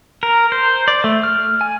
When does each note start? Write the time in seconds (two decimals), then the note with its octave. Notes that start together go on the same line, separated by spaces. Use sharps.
0.23 A#4
0.52 C5
0.88 D5
1.04 A3
1.23 F6
1.61 G#5